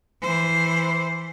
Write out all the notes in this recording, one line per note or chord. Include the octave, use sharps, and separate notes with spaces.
E3 C5